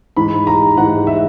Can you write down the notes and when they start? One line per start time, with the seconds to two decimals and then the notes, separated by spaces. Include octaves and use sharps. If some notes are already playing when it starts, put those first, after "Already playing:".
0.17 G#2 E3 B5
0.47 A#5
0.77 G#2 E3 F#5
1.07 E5